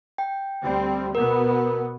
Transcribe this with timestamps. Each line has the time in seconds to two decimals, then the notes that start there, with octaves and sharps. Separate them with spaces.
0.18 G5
0.62 D2 G3 C4
1.15 B2 B3 A#4